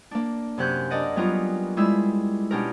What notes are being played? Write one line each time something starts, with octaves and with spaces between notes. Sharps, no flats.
A#3 D4
F#2 C3 C#4 F#6 G6
D4 A#4 D5 D#5 F#5
F#3 G3 B3 C#4 F4 A#4
G3 G#3 E4 F4 E6
B2 C#4 D4 G4 A#4